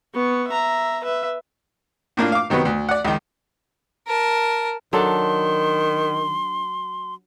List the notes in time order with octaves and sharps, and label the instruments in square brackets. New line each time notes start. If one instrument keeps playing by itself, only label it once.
[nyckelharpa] B3 C#6
E5 A#5
B4 E5
[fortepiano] A2 A#3 D4 F4
F5 D6
C3 D#3 F#3 B3 B4
D2
D5 F#5
C#2 D#3
[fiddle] A#4 A5
[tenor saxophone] D#3 [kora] F#3 D4 A4 [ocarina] C6